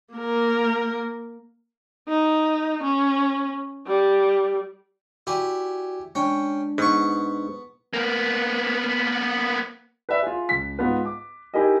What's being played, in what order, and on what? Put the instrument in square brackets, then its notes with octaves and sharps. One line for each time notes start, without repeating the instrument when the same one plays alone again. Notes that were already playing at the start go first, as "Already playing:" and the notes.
[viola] A#3 A#4
D#4
C#4
G3
[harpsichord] E4 G4 G#5 [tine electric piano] F#4 D5
[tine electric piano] G#3 D4 [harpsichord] C#4 G5
[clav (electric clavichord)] G#2 [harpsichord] B3 C#6
[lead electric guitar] A#3 B3
[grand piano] B4 D5 E5
F4 G#4
C#2 B6
G#2 B3 F4 B4
D6
D#4 E4 G4 G#4 A#4 D#5